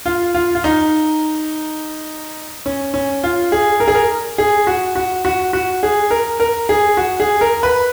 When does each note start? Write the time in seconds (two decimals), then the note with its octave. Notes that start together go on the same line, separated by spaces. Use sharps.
0.06 F4
0.34 F4
0.55 F4
0.64 D#4
2.66 C#4
2.94 C#4
3.24 F4
3.52 G#4
3.80 A#4
3.88 G#4
3.95 A#4
4.38 G#4
4.67 F#4
4.95 F#4
5.25 F#4
5.53 F#4
5.83 G#4
6.11 A#4
6.40 A#4
6.69 G#4
6.97 F#4
7.20 G#4
7.41 A#4
7.63 B4